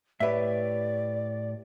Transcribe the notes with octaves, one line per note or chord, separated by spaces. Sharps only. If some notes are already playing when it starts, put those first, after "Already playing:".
A2 G4 B4 C#5 D5 E5